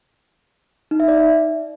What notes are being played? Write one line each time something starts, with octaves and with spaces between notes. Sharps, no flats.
D#4
E5
D5